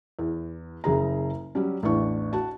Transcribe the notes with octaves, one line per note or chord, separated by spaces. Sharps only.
E2
F#1 C#3 G#4 A#5
F#3 G3 C#4
A1 E2 D4 C#6
F#4 A5